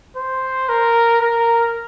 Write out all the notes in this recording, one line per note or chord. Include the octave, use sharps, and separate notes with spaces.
C5
A#4
A#4